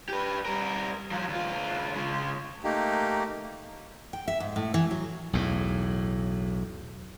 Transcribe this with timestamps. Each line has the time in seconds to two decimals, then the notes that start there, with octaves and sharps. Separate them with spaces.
0.09 G4 B4
0.45 G3 A#4
1.11 F3 F#3
1.28 D2 F4
1.95 C#3 G#3
2.64 A3 A#3 D#4 G4
4.13 G5
4.28 E5
4.40 G#2
4.56 A2
4.74 E3
4.91 F#3
5.33 B1 E2 A2